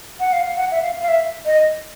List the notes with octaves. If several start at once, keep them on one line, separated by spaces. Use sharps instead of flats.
F#5
F5
F#5
E5
F5
F5
E5
D#5